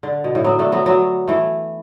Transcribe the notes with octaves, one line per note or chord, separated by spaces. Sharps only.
D3
B2
A2
F#3 B3
A3 D4
F#3 B3
F#3 B3
E3 A3